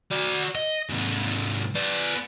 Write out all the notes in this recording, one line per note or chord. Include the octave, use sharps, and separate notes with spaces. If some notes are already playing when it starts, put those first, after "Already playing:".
F#4 D5
D#5
G#2 C3
B3 D5